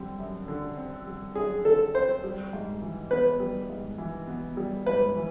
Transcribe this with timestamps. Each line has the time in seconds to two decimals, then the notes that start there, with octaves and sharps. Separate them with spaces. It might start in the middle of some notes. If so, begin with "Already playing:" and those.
Already playing: D3 G3 C4
0.19 F#2
0.48 D3
0.77 C4
1.07 G3
1.35 F#2 G#4
1.65 D3 A4
1.94 C4 C5
2.24 G3
2.53 G#2
2.82 E3
3.11 B3 B4
3.40 G3
3.70 G#2
3.98 E3
4.27 B3
4.57 G3
4.86 G#2 B4
5.15 E3